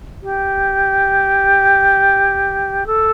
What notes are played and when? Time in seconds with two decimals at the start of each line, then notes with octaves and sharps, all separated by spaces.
0.22 G4
2.86 A4